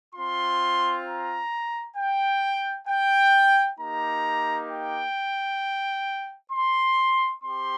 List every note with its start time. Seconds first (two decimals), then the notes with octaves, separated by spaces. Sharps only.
0.15 C4 F4 C6
1.06 A#5
1.97 G5
2.88 G5
3.79 A#3 D#4 G4 A#5
4.70 G5
6.52 C6
7.43 C4 G4 C6